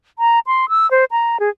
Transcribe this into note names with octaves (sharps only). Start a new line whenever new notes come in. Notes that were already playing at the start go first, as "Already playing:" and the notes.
A#5
C6
E6
C5
A#5
G#4